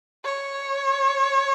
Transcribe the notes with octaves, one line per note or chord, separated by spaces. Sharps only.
C#5